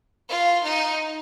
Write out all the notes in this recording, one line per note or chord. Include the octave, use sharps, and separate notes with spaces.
F4
D#4